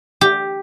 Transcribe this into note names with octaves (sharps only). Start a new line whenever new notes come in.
G4